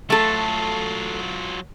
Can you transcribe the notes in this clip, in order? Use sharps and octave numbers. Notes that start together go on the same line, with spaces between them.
F#3 A3 F4 A4